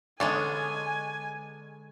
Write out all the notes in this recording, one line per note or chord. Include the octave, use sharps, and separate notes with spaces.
D3 G#3 B3 C#4 D4 G#5